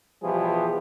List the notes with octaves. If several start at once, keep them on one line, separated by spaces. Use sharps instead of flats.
B2 E3 F3 G3 G4 G#4